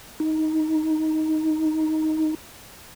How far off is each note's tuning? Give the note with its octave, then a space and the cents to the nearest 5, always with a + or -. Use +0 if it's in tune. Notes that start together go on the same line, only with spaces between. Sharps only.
D#4 +10